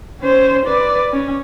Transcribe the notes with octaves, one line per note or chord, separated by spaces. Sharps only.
C#4 C5
B4 D5
C#4